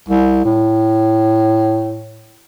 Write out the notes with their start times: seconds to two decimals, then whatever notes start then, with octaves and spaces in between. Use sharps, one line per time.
0.09 C2
0.45 A2